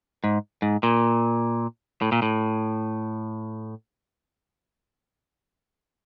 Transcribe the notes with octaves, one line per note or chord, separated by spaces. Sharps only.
G#2
G#2
A#2
A2
A#2
A2